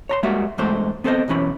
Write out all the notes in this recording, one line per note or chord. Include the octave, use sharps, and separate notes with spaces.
C#5 A#5 C6
G3 G#3 A#3 F#4 E5
E2 G2 G#3 A3 C5
B3 C4 A4 A#4 C5 D#5
B1 F#2 E3 C#4 B5